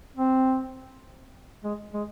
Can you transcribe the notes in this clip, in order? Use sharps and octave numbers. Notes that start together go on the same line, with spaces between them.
C4
G#3
G#3